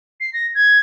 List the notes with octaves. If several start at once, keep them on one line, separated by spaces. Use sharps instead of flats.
C7
A#6
G#6